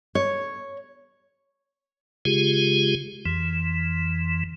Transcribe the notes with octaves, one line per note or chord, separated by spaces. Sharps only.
C#5
C#3 G#3 F4 G4 G#4
F2 E3